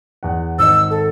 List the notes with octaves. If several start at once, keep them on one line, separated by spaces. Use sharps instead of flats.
E2 F#5
G#1 D#5 E6
A4